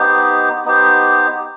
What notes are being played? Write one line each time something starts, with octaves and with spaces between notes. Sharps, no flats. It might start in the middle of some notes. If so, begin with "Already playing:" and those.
Already playing: B3 D#4 G4 C5
B3 D#4 G4 C5